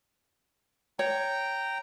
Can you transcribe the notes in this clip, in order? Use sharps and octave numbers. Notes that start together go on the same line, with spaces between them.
C#5 G5 A#5